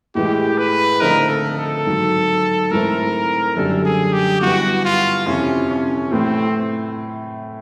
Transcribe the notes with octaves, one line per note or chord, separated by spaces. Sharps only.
A2 E3 G#3 G4
B4
D3 F3 A3 C4 D#4 A#4
A4
A4
G#2 D#3 F#3
G#2 E3 A3 C4 A#4
F#2 D3 G3 A4
G#4
G4
G2 E3 G3 B3 F#4
F4
F2 C3 E3 C#4
C#4
A2 E3 A3 C4